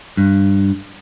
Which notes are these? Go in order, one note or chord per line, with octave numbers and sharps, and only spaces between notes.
G2